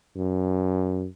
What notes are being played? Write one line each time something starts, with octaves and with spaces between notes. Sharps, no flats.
F#2